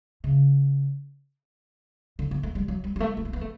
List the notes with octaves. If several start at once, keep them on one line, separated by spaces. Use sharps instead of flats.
C#3
D3
B3
A3
G3
F#3
G3
G3
A3
B3
A3
B3
A3